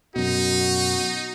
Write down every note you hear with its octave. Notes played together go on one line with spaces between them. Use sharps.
F#2 B2 D#4 F#4